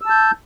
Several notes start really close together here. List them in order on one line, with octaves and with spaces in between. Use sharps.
E6 A5 G6